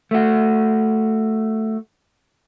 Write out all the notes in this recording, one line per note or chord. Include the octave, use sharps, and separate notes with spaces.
A3 F#4